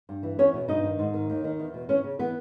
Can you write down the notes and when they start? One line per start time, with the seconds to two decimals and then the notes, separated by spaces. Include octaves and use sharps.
0.09 G2
0.23 E3
0.39 E2 C#4 C#5
0.54 B2
0.68 G2 D#4 D#5
0.84 D#3
0.99 G#2
1.14 D#3
1.30 D#2
1.44 D#3
1.59 E2
1.74 B2
1.89 E3 C#4 C#5
2.04 C#3
2.19 E3 B3 B4